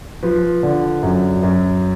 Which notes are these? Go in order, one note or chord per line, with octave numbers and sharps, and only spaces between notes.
F3 B4
D3
F#2
F#2